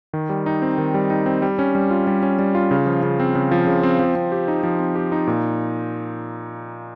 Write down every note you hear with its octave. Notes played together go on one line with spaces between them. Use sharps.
D#3
G3
D#4
C4
D#3
G3
D#4
C4
G3
C#4
G3
F4
G3
C#4
G3
F4
C#3
F3
C#3
C4
C#3
F3
C#3
C4
F3
C4
G4
D#4
F3
C4
G4
D#4
A#2